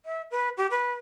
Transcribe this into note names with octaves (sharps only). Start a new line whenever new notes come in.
E5
B4
G4
B4